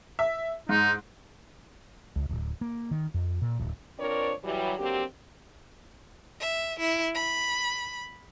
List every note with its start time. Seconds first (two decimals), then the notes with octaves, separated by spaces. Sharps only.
0.19 E5
0.69 G#2 D#4
2.16 C#2
2.29 D1
2.61 A#3
2.91 D#3
3.14 F2
3.42 A#2
3.59 D1
3.99 F3 C4 D4 A#4 C#5 D5
4.44 E3 F#3 G3
4.78 D3 F#3 A#3 C4 G4
6.40 E5
6.79 E4
7.15 B5